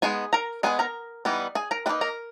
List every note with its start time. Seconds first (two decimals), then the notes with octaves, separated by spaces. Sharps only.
0.02 G#3 B3 D#4 G#4 G#5
0.33 A#4 A#5
0.63 G#3 B3 D#4 G#4 G#5
0.79 A#4 A#5
1.25 E3 G3 B3 D#4
1.55 G#4 G#5
1.71 A#4 A#5
1.86 E3 G3 A#3 D#4 B4 B5
2.01 A#4 A#5